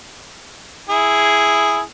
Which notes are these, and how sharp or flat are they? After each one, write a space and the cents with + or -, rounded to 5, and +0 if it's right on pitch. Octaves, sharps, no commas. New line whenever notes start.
E4 +0 G#4 +0